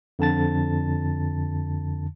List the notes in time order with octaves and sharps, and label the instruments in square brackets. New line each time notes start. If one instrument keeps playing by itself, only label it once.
[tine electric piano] F2 D3 A5 A6